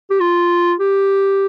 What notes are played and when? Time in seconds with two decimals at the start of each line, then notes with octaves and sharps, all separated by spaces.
0.11 G4
0.20 F4
0.79 G4